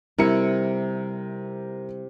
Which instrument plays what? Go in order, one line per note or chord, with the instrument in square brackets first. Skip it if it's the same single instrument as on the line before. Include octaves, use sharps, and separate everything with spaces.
[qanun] C3 [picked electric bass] G3 [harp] E4 [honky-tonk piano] A#4 C#7